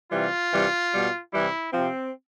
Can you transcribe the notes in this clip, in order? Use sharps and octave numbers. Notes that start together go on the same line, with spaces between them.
C3 E3 G3 F4
C3 E3 G3
B2 G3
C3 E3 G3 E4
C3 F3 C4